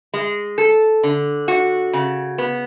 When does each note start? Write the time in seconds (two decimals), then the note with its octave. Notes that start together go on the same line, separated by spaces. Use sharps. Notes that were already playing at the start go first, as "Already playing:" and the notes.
0.14 G#3
0.58 A4
1.03 D3
1.48 F#4
1.93 C#3
2.38 B3